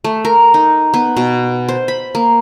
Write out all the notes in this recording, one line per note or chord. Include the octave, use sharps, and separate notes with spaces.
A3
A#4
D#4
B3
B2
C5
B5
A#3